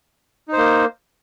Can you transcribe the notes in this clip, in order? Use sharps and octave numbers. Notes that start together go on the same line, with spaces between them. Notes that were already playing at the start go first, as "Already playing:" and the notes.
A#3 D#4 C5